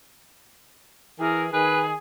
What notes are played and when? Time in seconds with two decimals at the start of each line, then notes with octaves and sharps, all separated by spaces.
1.20 E3 G#4 A#4
1.53 D#3 G#4 B4